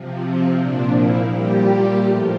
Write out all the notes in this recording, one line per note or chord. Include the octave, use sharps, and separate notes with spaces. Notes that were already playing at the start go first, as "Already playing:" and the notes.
Already playing: C3 F3
C4
A#2 F3 D4
E4
A#2 G3 G4
A2 F3